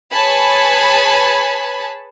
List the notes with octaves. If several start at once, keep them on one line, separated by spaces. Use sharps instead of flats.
G#4 B4 C#5 G#5 A5 B5